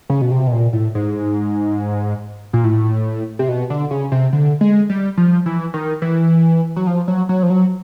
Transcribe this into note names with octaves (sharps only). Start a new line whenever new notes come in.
C#3
B2
C3
B2
A#2
A2
G#2
A#2
A2
C3
B2
D3
C#3
C3
D3
G#3
G3
F3
E3
D#3
E3
F#3
F3
F#3
F#3
F3
F#3